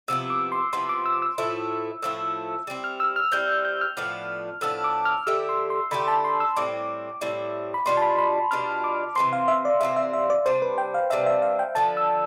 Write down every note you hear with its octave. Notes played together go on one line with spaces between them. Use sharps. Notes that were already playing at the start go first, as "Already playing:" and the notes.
C3 F3 B3 E4 E6
D6
C6
C3 F3 B3 E4 C6
D6
E6
E6
A2 F3 A3 E4
A2 F3 A3 E4 E6
G3 C4 E4
F6
E6
F6
G3 C4 E4 G6
G6
F6
A2 F3 B3 D4
A2 F3 B3 D4 E6
D6
F6
D3 A3 E4 G4 E6
C6
C6
D3 A3 E4 G4 B5
A5
C6
E6
A2 G3 C4 E4 D6
A2 G3 C4 E4
B5
B2 G3 D4 F4 C6
A5
B5
B5
B2 G3 D4 F4 F6
D6
C3 E3 A3 C4 C6
F5
E5
D5
C3 E3 A3 C4 E5
E5
E5
D5
C3 G3 D4 C5
B4
G5
F5
C3 G3 D4 E5
E5
F5
G5
D3 F3 B3 A5
E6